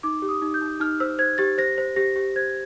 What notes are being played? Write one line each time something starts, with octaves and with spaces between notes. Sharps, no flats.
D#4 D6
G4
D#6
D#4
G6
D#4
D#4 F6
C5 E6
C5 G#6
G4 A6
C5 A#6
C5
G4 A#6
G4
C5 G#6